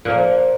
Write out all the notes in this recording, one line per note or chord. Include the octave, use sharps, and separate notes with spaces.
A#2 F3 A#3